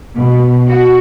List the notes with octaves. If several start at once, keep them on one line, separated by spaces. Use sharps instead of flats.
B2
F#4